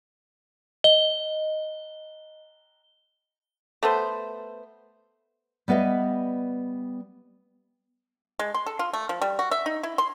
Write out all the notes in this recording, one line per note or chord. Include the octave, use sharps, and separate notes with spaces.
D#5 G7
A3 B3 C5
G3 B3 B4 D#5 E5
G#3
C6
A4
F4
A3
F3
G3
F#4
E5
D#4
E4
C6